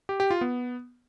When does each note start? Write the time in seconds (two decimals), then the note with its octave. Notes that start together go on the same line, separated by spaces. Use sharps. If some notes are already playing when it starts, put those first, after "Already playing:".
0.09 G4
0.20 G4
0.31 F4
0.41 B3